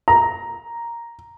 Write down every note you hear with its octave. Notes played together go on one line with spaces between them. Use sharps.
A#5